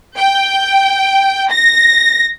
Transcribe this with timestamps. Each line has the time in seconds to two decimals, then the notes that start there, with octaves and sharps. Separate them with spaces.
0.17 G5
1.51 A#6